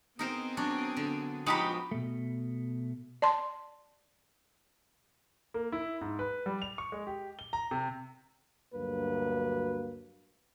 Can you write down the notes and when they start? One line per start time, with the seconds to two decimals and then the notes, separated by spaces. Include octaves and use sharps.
0.19 B3 C4 D#4 G#4 A#4 C5
0.57 F#3 D4 C#5
0.97 D3
1.46 F3 G#3 B3 D#4 F#4 G4 B5
1.91 B2 A3
3.22 D5 A5 C6
5.54 A#3
5.72 E4
6.01 G#2
6.19 B4
6.46 G3
6.62 F7
6.78 C#6
6.92 G#3
7.07 G4
7.39 G7
7.53 A#5
7.71 C3
8.74 D2 G2 F#3 A#3 B4